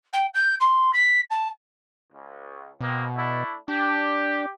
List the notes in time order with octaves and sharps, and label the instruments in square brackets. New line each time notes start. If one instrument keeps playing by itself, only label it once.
[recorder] G5
G6
C6
B6
A5
[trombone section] C#2
[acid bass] B2 [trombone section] G#3 A#3 C4
[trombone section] A3 D4 E4
[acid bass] D4 [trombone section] G4